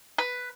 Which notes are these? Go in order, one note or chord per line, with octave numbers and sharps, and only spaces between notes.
B4